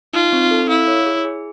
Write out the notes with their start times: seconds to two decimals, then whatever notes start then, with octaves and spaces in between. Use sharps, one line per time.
0.14 D#4 F4
0.33 C4
0.51 A4
0.69 E4 F5
0.88 C#5
1.06 G#4
1.25 G#4